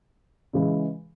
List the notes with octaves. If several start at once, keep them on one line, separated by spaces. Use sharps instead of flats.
C#3 E3 G#3